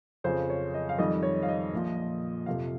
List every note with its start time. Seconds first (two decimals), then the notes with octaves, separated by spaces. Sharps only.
0.24 F2 C#3 F3 C5
0.50 C#5
0.74 D#5
0.89 F5
0.98 F2 D#3 G3 D#5
1.23 C#5
1.43 F5
1.48 D#5
1.73 A#1 A#2 F3
2.46 F2 C3 F3 F5